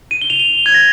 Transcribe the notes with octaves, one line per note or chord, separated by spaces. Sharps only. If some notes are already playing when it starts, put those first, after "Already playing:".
D#7
G7
F7
G7
G#6
A#6